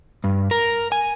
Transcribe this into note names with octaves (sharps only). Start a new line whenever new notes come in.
G2
A#4
G#5